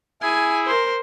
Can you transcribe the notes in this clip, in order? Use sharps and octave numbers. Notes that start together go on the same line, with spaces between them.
E4 G#4 G#5
A#4 C5